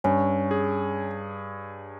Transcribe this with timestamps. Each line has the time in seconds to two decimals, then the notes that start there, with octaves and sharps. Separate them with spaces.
0.04 G2 C#4
0.51 G#4